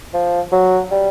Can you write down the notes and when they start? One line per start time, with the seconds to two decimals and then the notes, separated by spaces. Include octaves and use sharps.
0.14 F3
0.52 F#3
0.91 G3